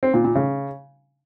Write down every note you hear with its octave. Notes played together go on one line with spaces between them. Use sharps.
C4
A#2
A#2
C#3